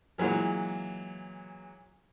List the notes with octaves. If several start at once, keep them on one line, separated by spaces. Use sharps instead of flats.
A#2 E3 F#3 G#3